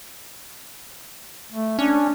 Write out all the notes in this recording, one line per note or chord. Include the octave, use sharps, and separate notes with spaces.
A3
C#4 D4